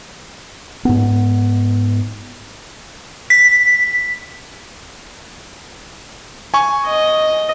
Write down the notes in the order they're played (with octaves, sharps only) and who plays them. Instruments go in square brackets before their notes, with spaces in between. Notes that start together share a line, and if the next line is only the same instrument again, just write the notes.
[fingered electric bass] G#2 B3
[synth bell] B6
[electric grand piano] G#5 C#6
[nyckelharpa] D#5